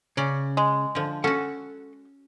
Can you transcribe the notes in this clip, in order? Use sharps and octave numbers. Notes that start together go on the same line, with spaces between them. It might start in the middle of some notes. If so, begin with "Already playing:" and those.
C#3 C#4 D5
G#3
D3 F3
C#4 F#4 A4 F#5